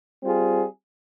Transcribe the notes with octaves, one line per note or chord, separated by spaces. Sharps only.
G3 C4 F4 G#4